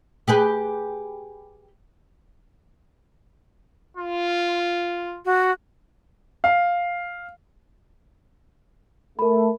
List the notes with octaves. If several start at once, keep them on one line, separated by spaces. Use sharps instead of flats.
G4 G#4 B4
F4
F#4
F5
A3 A#4 B5